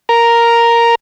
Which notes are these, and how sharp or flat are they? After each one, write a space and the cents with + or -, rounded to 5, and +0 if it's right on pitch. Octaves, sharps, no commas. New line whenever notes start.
A#4 +0 A#5 +0